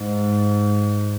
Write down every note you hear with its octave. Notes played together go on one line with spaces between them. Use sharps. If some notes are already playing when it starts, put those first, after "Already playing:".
Already playing: G#2